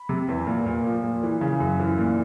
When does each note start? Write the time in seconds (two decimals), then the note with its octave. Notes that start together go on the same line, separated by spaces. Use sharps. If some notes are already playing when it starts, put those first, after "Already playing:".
Already playing: B5
0.09 C3
0.29 E2
0.47 A#2
0.66 A#2
0.85 F3
1.03 A#2
1.23 E3
1.41 C#3
1.60 F#2
1.80 E3
1.98 A#2